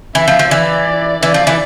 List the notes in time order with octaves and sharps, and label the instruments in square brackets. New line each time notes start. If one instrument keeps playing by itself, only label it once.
[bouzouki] E3 [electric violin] E5
[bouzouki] F3
F3
[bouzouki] E3 [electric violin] D5
[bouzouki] E3 [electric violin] D5
[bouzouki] F3
E3